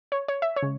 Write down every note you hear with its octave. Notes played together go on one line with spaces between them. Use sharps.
C#5
C#5
E5
C#5
C#3 G#3